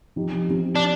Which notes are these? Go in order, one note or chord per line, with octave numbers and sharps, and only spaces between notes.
C3 F3 C4 D#4 G4
C3 F3 C4 D#4 G4
D4